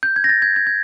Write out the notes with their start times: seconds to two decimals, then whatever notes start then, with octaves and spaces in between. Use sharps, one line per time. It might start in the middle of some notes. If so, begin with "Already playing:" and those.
0.03 G6
0.16 G#6
0.24 A#6
0.29 A6
0.42 G#6
0.56 G#6
0.67 G#6